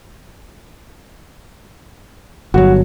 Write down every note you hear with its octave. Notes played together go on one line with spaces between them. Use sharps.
G1 F#3 F#4